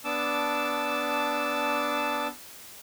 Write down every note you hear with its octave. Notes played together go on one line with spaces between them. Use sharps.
B3 D4 A5 D6 E6